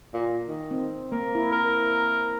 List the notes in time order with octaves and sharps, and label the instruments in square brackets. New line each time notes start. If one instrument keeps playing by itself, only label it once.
[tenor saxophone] A#2
D#3
[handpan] C4
[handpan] A#3 [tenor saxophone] A#4
[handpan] E4
[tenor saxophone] A#4